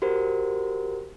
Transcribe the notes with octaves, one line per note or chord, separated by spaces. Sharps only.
F#4 G4 A#4 C5